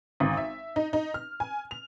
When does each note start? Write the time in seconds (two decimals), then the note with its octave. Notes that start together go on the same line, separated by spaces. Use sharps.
0.20 G#1
0.37 E5
0.76 D#4
0.93 D#4
1.14 F6
1.40 G#5
1.71 F7